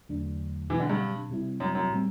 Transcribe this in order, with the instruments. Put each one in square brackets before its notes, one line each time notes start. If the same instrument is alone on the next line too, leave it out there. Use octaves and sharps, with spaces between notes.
[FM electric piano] E2 D3 F#3 A3 D4
[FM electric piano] B2 F#3 C4 G4 [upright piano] E3
[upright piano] D3
G2
[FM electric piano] C3 G3 C4 E4
[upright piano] F#2
F#2
[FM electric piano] A2 G3 C4